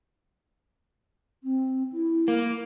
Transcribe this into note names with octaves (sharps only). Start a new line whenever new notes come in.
C4
E4
A#3